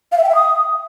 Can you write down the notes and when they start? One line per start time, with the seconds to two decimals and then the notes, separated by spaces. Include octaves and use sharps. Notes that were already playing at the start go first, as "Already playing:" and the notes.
0.12 F5
0.18 E5
0.23 G5
0.29 E5
0.35 D#6